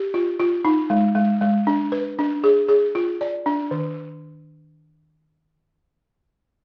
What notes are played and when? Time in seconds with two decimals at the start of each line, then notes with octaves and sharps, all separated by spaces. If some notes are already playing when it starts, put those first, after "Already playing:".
Already playing: G4
0.14 F4
0.39 F4
0.65 D#4
0.90 G#3
1.15 G#3
1.41 G#3
1.67 D4
1.92 B4
2.19 D4
2.44 G#4
2.69 G#4
2.95 F4
3.21 D5
3.46 D4
3.71 D#3